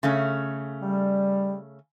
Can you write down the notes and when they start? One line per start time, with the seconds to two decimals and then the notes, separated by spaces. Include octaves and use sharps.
0.03 C#3 A3 C#4
0.80 G3